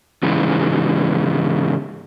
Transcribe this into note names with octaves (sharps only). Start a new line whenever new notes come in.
G#2 C#3 E3